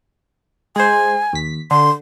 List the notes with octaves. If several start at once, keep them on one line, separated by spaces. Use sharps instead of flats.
G#3 C5 G#5
D#2 B6
D3 C6